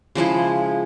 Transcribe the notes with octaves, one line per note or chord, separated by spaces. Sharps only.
C#3 F3 G#3 E4